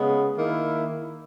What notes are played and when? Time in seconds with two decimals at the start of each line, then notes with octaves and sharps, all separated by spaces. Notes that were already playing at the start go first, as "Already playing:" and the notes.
Already playing: C#3 G#3 B3
0.37 D#3 A#3 E4